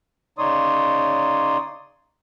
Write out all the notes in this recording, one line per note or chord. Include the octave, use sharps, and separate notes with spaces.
C#3 D#4 C#5 D5 C6 D#6